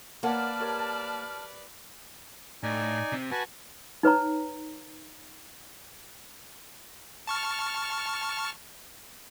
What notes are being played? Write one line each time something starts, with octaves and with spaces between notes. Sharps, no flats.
A#3 A#4 B4 C#5 D5 F#5 A5 F6
G4 A#4 C#5
A2 D#4 D5 G#5
C3 C4
F#4 B4 G#5 A5
D#4 B4 C#5 A#5
A5 C#6 F6